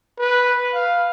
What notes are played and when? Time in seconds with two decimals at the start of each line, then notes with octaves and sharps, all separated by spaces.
0.18 B4
0.74 F5